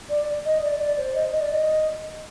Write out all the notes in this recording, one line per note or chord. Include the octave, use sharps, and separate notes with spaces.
D5
D#5
D5
D5
C5
D#5
D#5
D5
D#5